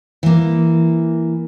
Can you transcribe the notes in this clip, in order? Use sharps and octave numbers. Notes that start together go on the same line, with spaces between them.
E3 A#3